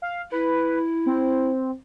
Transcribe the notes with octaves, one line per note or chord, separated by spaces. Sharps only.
F5
E4 B4
C4